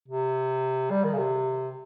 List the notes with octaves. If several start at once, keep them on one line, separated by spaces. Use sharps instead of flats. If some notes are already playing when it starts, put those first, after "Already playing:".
C3
G3
D#3
C#3
C3